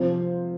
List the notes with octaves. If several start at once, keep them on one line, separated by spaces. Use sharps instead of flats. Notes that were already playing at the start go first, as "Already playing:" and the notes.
Already playing: C3 F3 C4 F4 C5